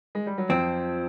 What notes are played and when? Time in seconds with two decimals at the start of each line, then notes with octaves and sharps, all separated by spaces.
0.15 G#3
0.27 G3
0.38 F#3
0.49 F2 F3 C4